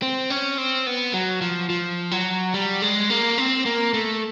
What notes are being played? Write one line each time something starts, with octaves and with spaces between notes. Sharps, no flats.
C4
C#4
C4
B3
F#3
F3
F3
F#3
G3
G#3
A#3
C4
A#3
A3